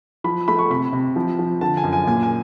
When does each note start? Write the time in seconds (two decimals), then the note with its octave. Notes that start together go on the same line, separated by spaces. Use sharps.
0.24 F3 B5
0.48 A3 B5
0.59 C#6
0.70 C3 B5
0.93 C3
1.16 F3
1.39 F3
1.61 D3 A5
1.77 G#5
1.84 F#2
1.93 G#5
2.07 A#2 G#5
2.23 G#5